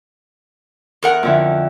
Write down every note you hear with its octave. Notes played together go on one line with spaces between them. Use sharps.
E2 A#4 F#5
F2 D3 E4